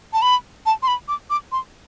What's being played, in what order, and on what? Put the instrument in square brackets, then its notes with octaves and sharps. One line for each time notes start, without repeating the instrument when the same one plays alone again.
[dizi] A5
B5
A5
C6
B5
D6
D6
C6